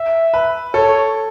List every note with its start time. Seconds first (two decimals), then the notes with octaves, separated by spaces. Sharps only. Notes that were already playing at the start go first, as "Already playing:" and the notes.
Already playing: E5
0.34 B4
0.74 A4 C#5